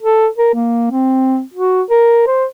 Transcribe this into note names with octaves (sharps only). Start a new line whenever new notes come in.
A4
A#4
A#3
C4
F#4
A#4
C5